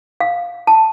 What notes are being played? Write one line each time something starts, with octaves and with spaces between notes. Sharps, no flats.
F5
A5